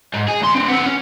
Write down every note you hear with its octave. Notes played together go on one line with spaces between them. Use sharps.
G#2
G#4
D2 C6
C4 D4
B3 C4
C#4